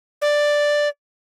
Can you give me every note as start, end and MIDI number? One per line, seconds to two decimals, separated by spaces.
0.22 0.88 74